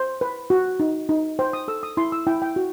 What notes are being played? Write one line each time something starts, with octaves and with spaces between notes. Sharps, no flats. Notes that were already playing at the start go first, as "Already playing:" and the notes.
Already playing: C5
B4
F#4
D#4
D#4
C5 G5
D#6
A4 E6
D#6
E4 C6
E6
E4 G5
G5
F#4